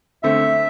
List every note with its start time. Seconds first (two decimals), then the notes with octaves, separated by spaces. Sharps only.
0.23 D3 A3 C4 E5